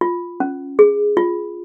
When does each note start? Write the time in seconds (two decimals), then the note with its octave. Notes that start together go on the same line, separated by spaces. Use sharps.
0.01 F4
0.40 C#4
0.79 G#4
1.17 F4